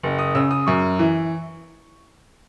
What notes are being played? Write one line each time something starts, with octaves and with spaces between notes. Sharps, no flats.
F#1
D#6
C#3 E6
D#6
F#2 C#6
E3